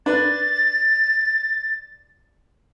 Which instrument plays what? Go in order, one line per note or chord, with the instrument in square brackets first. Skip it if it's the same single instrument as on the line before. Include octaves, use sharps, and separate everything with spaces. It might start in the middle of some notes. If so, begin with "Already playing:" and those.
[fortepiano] D4 B4 [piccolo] A6